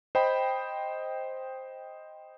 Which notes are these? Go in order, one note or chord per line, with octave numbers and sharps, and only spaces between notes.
C5 D#5 G5 B5